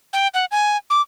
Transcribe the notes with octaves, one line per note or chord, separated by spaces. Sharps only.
G5
F#5
G#5
D6